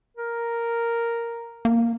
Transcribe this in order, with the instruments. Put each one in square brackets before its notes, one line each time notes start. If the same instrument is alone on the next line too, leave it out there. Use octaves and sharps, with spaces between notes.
[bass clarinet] A#4
[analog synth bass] A#3